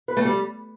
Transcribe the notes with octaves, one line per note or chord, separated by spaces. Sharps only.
B4
A3
G3